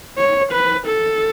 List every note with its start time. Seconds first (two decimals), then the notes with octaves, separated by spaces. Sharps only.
0.18 C#5
0.52 B4
0.86 A4